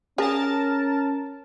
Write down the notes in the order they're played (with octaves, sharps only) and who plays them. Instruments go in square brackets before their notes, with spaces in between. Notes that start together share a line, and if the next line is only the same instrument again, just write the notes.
[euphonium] C#4 [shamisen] G#4 [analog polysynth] A#4 A5